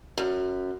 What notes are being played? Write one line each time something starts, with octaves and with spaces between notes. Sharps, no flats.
F#2